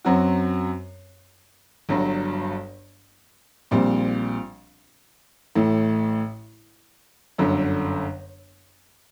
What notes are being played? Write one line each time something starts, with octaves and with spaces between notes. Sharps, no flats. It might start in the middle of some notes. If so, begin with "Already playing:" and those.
F#2 F#3 C4 F#4
G1 G2 F#3
A#1 A#2 G3 C4
A1 A2 A3
G1 F#2 D3